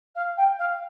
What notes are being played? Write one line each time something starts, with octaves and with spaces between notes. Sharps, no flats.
F5
G5
F5